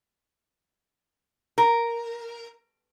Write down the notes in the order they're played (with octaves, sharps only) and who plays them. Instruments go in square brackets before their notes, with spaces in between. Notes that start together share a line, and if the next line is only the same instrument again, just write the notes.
[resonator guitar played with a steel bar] A#4